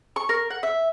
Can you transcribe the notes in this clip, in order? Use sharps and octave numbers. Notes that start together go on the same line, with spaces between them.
C#6
A#4
F#5
E5